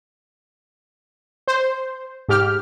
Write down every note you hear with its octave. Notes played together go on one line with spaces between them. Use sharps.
C5
G#2 G4 F6